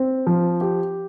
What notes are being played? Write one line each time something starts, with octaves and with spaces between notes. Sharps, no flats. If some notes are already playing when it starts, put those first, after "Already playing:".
Already playing: C4
F3
G4